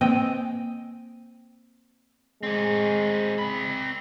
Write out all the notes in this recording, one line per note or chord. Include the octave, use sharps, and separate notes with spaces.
A#3 C4 D#5 G5
G#3 C4 G#4
C4 B5